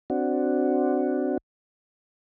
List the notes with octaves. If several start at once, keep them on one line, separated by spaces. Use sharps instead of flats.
C4 D4 F#4